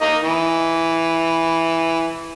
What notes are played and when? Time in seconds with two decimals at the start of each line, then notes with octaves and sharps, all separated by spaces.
0.02 A#3 D#4 D#5
0.24 E3